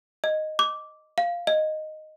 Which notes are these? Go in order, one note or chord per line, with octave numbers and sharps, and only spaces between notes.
D#5
D6
F5
D#5